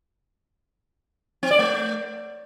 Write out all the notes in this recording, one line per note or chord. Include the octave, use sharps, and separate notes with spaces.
C4
D5
A3